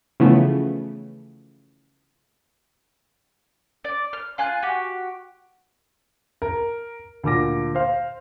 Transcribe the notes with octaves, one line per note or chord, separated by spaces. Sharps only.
C#3 E3 F3 A3 B3
D5
F6
F4 G#5 C6 F#6
F#4 G4
A#4
D2 A#2 D6 A#6
C5 F5